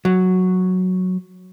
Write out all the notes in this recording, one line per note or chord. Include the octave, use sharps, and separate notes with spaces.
F#3